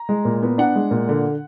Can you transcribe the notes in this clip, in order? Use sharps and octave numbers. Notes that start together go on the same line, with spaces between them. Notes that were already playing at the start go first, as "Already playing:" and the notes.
Already playing: A#5
G#3
A#2
B3
D4 F#5
G#3
A#2
D3